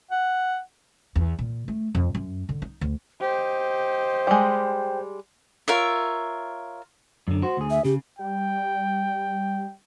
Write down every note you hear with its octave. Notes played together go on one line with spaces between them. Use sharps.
F#5
E2
A#2
A3
F2
F#2
D3
D#4
D2
G4 C5 D#5
G3 G#3 G5
F4 A#4 C#5 E5
F#2 D3
F#4 C5
D2 G#4
E5
C#3 G4
G3 G5